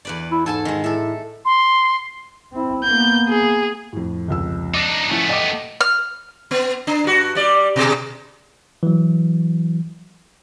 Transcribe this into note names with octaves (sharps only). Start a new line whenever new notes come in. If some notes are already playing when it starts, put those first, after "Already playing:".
E2 B4 D5
E4
G#2 A4 G#5 A5
D#3 G#3
A2 A4 E5
C6
C4 E4
A#3 B3 G6
G#4
F2 A2
F1 C#2 E6
D4 D#4 D6
F3 A3 B3 C#4 E4
D#5 G5 D6
F6
B3
D4
G2 F#4
G3 D5
B2 G#4
E3 F#3